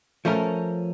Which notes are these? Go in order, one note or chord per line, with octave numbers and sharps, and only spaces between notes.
F3 A3 C#4 A#4